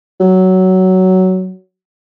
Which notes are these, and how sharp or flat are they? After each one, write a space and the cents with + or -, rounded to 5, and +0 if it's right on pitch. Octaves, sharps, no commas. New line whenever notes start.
F#3 +10